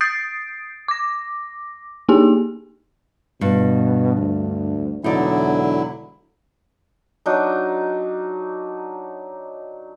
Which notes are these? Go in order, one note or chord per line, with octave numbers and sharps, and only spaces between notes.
D#6 G6 A6 C7 D7
D6 A#6
A#3 D4 D#4 G4 G#4 G#5
G2 B2
D2
E1 D3 F#3 D#4 E4 D5
F#3 D4 D#4